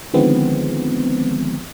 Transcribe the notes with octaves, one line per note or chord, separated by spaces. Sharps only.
D3 D#3 F3 G#3 B3 C4